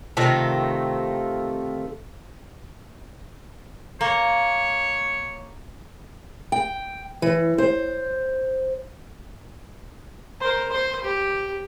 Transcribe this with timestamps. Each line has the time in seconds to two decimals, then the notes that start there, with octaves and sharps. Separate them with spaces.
0.17 C3 D#3 A3 F4
4.01 A#3 C#5
6.52 G5
7.22 E3
7.58 C5
10.40 A#4 C5
10.71 C5 C6
11.04 G4